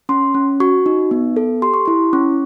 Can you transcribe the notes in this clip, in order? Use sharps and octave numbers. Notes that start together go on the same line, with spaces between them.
C#4 C6
C#4
F#4 C#6
D#4
B3
A4
G4 C6
C#6
E4 C6
C#4 C#6